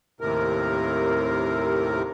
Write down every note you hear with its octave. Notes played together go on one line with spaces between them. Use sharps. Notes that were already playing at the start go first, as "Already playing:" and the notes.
D#2 A2 C3 A#4